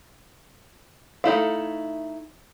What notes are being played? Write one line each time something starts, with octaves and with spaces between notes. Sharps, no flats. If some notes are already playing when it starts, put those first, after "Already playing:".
A3 D#4 E4 F5